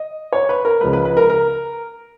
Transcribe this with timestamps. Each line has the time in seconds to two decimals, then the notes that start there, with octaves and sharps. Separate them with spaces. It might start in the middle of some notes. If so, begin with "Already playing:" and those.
Already playing: D#5
0.33 C#5
0.49 B4
0.65 A#4
0.81 C#2 C#3 F3 G#3 B4
0.93 B4
1.05 B4
1.17 A#4
1.30 A#4